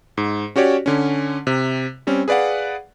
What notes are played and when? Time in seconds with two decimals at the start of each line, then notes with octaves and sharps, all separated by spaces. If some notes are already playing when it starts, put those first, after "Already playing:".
0.18 G#2
0.56 C#4 F#4 G4 C#5 D5
0.86 D3 C#4
1.47 C3
2.07 G3 C4 C#4
2.28 G#4 B4 D5 F5 F#5